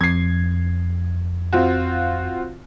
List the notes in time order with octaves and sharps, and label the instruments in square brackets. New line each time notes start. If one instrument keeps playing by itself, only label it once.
[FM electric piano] F2 [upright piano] G#6 C7
[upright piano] C4 F4 F#4